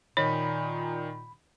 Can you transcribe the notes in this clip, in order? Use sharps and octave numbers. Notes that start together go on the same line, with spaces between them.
A#2 D#3 D#4 C#5 B5